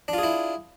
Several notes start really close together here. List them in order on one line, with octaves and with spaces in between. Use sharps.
D4 F4 G#4 E4